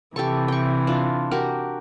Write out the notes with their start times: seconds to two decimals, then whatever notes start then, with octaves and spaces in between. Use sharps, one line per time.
0.16 C3 E3 G4 A4 C#6
0.48 G5 C#6
0.87 D4 F4
1.31 F#4 G4 A#4